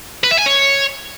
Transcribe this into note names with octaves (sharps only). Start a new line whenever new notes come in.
B4
E5
G#5
C#5